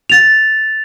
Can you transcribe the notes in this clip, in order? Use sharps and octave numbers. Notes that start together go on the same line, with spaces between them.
A6 F7